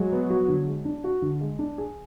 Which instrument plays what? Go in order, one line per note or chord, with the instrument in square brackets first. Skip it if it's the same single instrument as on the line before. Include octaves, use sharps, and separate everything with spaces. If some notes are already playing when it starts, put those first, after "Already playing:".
Already playing: [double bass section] F#3 [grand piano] G#3
[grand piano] B3
F#4
D3
G#3
D4
F#4
D3
G#3
D4
G#4